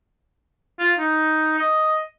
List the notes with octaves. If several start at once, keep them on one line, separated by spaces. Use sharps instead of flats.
F4
D#4
D#5